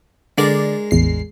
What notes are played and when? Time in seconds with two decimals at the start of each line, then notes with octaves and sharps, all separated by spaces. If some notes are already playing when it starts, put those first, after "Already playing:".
0.38 D3 G#3 D4 A#4 D5
0.91 A1 E2 C7